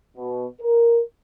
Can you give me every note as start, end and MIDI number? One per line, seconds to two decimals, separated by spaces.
0.17 0.46 47
0.61 1.00 70